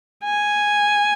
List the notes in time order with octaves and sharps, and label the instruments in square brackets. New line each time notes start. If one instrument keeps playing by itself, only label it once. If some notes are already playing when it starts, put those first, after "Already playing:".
[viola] G#5